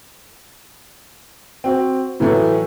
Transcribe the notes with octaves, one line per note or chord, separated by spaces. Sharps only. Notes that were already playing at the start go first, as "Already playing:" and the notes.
C4 F#4
A2 E3 F#3 A3